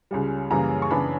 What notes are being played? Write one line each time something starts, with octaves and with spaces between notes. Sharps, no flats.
C#2 C#3 G3
F#2 C#3 E3 G3 A#3 A#5
C#6
F#2 C#3 E3 B3 D4 B5